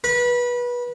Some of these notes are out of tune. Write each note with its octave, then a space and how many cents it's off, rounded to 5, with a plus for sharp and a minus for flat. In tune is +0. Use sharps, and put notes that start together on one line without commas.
B4 -25